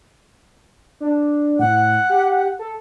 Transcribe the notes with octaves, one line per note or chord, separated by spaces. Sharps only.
D4
A2 F#5
G4
A4